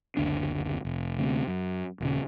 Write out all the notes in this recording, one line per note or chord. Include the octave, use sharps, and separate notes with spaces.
F#1 D2 D4
F1
D2 C3
F#2
D#1 C#3